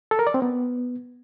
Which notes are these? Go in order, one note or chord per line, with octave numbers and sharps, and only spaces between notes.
A4
A#4
D5
C4
B3